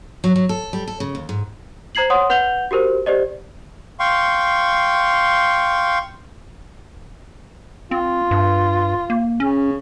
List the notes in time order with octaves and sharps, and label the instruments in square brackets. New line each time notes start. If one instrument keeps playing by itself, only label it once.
[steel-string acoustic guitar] F#3
F#3
A4
G3
A4
C#3
D#2
G#2
[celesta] C5 A#5 G#6 C7 F#7
C#5 F#5 C6 D#6
B4 F#5 G6 F7 G7
F#4 G4 A#4 C5
G4 C5 D5 D#5
[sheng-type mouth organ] F5 G5 C6 C#6
[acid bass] C4 [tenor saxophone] F4
[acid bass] G2
A#3
[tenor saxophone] C#3 [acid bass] C#4